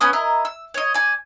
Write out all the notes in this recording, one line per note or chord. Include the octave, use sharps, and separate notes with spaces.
B3 C#4 G#5 D#6
E4 A#4 D#5
E6
C#5 D#5
D5 G#5